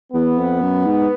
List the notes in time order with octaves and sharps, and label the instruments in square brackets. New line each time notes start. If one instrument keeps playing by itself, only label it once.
[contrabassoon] E2 [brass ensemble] B3
[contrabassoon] F2
F#2
G#2